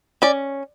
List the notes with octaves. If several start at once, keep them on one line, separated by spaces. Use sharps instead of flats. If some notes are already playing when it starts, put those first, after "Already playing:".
C#4 D5